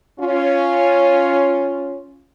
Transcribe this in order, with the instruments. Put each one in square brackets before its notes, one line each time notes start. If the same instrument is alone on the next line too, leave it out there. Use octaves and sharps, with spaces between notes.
[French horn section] C#4 F4